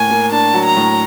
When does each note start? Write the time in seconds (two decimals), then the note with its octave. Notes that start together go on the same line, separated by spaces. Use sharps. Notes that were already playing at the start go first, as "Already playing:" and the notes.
Already playing: A2 A#3 G#5
0.10 A#3
0.32 D4 A5
0.54 F#3
0.65 A#5
0.77 A2